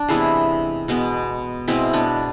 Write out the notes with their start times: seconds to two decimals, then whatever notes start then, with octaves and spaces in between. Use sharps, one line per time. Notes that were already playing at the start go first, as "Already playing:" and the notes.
Already playing: D4
0.08 C3 E3 G#3 B3 E4 G#4
0.88 B2 G#3 B3
1.68 B2 G#3 B3 C4 E4
1.93 B3 D4